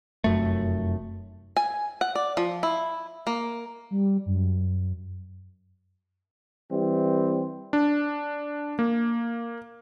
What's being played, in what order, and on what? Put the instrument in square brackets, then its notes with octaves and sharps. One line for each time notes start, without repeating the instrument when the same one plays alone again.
[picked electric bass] F1 F#2 A3
[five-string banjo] G#5
F#5
D5
F3
E4
A#3
[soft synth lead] G3
F#2
[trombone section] E3 G3 C4
[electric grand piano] D4
A#3